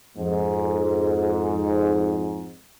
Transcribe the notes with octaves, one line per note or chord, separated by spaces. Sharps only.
F2 G#2